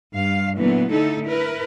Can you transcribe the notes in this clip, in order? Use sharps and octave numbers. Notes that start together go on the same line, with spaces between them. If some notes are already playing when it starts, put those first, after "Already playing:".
G2 F5
A#2 D3 E3 F#3 B3
D3 A3 D#4 E4 A4
E4 A#4 B4